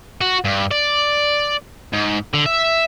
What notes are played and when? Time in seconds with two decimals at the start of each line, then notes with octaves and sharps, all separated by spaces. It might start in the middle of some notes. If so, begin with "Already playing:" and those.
0.21 F#4
0.45 G2
0.71 D5
1.93 G#2
2.34 D3
2.46 E5